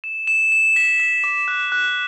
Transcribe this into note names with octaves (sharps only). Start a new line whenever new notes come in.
E7
E7
E7
B6
B6
D6
F#6
F#6